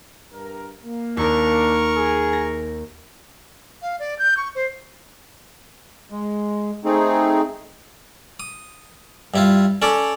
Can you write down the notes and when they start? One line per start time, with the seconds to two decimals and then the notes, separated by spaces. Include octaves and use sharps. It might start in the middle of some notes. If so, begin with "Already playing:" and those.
0.33 G2 A#4
0.84 A#3
1.17 D#2 D4 A#4 C#6
1.96 G#4
2.33 A#6
3.82 F5
3.99 D5
4.19 G6
4.37 C#6
4.55 C5
6.11 G#3
6.84 A3 C4 D#4 G#4
8.40 D#6
9.34 G2 E4 F4
9.82 C#4 A4 D5